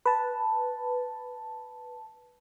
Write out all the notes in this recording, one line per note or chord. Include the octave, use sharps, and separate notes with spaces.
B4 A5